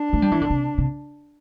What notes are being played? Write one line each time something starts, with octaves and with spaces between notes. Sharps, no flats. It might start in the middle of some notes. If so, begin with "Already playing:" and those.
Already playing: D4
A3
G3
E3
D3
C3
C3